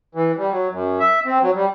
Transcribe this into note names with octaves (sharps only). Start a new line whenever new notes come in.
E3
G3
F#3
F#2
E5
C4
F#3
G3